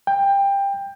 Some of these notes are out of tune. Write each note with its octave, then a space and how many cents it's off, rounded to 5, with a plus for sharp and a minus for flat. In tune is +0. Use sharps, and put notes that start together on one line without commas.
G5 +20